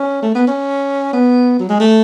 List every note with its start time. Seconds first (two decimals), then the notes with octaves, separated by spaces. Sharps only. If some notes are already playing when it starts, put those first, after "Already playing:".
Already playing: C#4
0.23 A3
0.35 B3
0.48 C#4
1.13 B3
1.60 F#3
1.69 G#3
1.80 A3